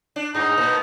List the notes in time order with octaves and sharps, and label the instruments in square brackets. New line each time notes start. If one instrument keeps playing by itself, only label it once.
[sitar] D4
[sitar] G2 [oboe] D#4
[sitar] A2 B3